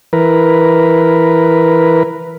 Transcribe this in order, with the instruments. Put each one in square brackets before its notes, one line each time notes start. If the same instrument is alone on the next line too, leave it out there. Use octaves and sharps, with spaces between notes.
[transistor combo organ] E3 A#4 B4